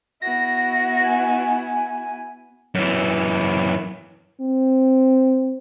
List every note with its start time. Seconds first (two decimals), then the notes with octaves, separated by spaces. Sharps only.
0.22 B3 E4 F#4 A#6
1.04 G#5
2.75 F#2 E3
4.41 C4